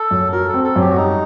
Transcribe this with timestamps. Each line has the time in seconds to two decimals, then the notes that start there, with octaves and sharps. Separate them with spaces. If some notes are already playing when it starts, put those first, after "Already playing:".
Already playing: A4
0.11 F#2
0.32 F#4 A#4
0.48 A4
0.54 C4
0.64 A4
0.76 F#2 G4
0.90 F#4
0.97 G3 D#4